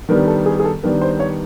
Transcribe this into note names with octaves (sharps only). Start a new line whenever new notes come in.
D#3 G3 B3 D4 A#4
A4
G#4
G#4
A4
D#3 G3 B3 D4 A#4
C5
C#5